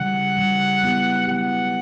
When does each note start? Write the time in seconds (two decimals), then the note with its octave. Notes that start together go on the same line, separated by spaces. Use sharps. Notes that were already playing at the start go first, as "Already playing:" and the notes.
Already playing: C#3 E3 G3 F#5
0.36 C#3 E3 G3
0.82 F#3 B3 E4 G4
1.27 F#3 B3 E4 G4 F#5